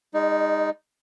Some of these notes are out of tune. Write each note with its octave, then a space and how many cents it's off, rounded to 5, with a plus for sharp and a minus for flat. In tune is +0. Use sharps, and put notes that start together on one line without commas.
G#3 -35 D#4 +0 D5 +0